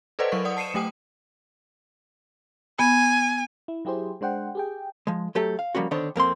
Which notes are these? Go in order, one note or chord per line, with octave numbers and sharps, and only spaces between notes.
A4 B4 C5 D5 D#5 F#5
F#3 A#4 C#6
D5 F#5 D#6
A5 C7 C#7 D#7 E7
F#3 A3 G5 D#6
B3 G#5
E4
F#3 E4 G4 G#4 C5
G#3 D4 C5 F#5 G5
G4 G#4 G5
F3 G#3
F#3 A3 G4 A4
F5
F3 G3 A#3 C#4 F#4
D3 D#3 B3 D4 C5 C#5
F2 A#3 C4 C6